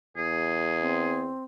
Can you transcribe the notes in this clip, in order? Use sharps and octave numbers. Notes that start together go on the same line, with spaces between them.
E2 G#4
C4